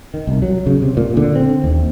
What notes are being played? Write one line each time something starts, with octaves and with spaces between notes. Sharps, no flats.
D#3
C2
F#3
C#3
C3
A#2
D3
C4
D#2